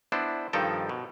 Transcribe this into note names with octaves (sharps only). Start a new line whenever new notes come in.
B3 D4 E4 C5
G2 D#3 F3 D#4 A4 G5
B2